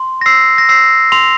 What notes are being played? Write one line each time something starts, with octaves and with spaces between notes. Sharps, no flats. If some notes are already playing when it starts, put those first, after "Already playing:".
Already playing: C6
A#6
E6 C7
A#6
E6 C7
C6 F7